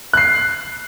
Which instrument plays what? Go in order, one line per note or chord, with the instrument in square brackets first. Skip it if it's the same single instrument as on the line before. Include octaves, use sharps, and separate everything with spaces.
[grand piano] F#6 C7